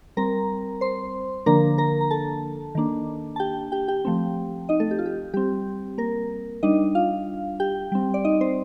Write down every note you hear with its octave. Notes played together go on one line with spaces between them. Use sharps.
G3 C4 A#4 A#5
C5 C6
D3 F3 A#3 D4 A#4 A#5
A#4 A#5
A#5
A4 A5
D#3 A#3 D4
A5
G4 G5
G4 G5
G4 G5
F3 A3 C4
D#4 D#5
A3 A4
G4
F4
G4
G3 C4 G4
A#3 A#4
G3 D4 D#4 D#5
F4 F5
G4 G5
G3 C4
D5
D#4 D#5
C4 C5